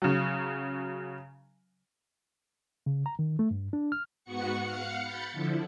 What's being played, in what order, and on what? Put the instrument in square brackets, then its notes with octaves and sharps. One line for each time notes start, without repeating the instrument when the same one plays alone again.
[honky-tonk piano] C#3 F#3
[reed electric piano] C#3
A#5
D#3
A3
G2
D4
F6
[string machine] G#2 B3 F#4 F#5 C#6 C#7
F5 F#5 C#7
B5 G6 A6 C#7
D3 F3 E4